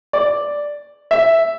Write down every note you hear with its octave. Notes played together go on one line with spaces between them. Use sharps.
D5
E5